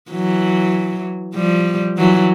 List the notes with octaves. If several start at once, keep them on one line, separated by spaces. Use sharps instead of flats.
E3 F#3
F3 G3
E3 F#3